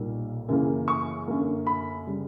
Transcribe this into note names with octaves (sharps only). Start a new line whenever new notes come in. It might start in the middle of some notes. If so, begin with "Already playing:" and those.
Already playing: B1 A#2 G3 A#3
F#2 C#3 E3 A#3
C#6
F#2 D3 A#3
B5
C#3 G3